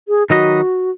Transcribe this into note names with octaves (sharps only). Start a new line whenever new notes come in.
G#4
D#3 F#3 D#4 F#4 B4 D#5